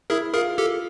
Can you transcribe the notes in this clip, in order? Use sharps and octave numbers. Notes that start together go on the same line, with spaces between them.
E4 G#4 A#4
F4 G#4 A#4
G4 A4